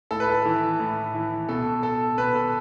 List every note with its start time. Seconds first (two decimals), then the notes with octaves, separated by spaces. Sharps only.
0.11 A2 A4
0.20 B4
0.30 A4
0.45 E3
0.80 A2
1.14 E3
1.49 B2 A4
1.83 A4
2.18 B2 B4
2.35 A4